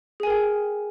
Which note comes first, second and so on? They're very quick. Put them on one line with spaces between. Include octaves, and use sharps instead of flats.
G#4 G#5 A#4 G5